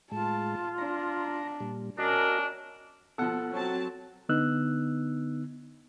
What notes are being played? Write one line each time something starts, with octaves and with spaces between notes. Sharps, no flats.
A2 G#3 F4 A5
D4 A#5
A#2 G3
C#4 D4 F#4 A#4 D#5 A#5
B2 F3 A4 F#5
F#3 C4 A5
D3 B3 D#4 E6 F#6